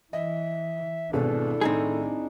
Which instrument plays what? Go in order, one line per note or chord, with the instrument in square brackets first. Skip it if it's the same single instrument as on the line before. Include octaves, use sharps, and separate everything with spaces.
[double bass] E3 [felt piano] D#5 [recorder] E5
[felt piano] G#1 B2 G#4 [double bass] D4 E4 [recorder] A4
[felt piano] A2 D#3 [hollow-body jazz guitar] C4 D#4 G#4